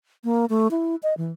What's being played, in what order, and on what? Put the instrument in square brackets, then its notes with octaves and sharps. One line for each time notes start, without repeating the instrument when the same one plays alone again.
[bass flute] A#3
A3
E4
D#5
E3